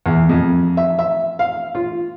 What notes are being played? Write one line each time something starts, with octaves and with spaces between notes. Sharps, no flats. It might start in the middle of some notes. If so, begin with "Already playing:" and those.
E2
F2
E5
E5
F5
F4